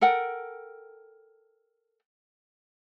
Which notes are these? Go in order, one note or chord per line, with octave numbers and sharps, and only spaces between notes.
A4 A#4 F#5 G5